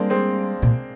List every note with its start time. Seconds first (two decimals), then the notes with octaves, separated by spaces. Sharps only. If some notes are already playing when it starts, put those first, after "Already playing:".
Already playing: G3 G#3 A#3 C4 D4
0.10 G#3 C4
0.62 A#2